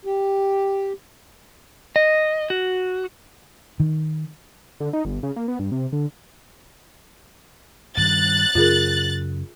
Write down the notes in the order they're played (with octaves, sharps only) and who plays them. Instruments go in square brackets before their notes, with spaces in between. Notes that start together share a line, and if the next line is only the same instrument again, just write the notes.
[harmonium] G4
[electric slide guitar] D#5
F#4
[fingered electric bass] D#3
[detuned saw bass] D3
D#4
G1
C#3
A#3
B3
G2
C3
D3
[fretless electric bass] G2 D#3 G3 [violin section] F#6 A6
[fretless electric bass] F#2 C#3 [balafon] F4 G#4 A#4